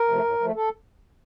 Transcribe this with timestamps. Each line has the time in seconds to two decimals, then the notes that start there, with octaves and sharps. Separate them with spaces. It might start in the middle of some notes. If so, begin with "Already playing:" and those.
Already playing: A#4
0.08 C3 F3 A3
0.24 A2
0.40 F3 A3
0.55 A4